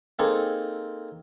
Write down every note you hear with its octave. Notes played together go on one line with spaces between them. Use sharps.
A#3 C4 D#4 G#4 A4